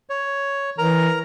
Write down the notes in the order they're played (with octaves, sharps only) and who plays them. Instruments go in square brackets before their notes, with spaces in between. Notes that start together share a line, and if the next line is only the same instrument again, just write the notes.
[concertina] C#5
[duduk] E3 [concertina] A#4 A#5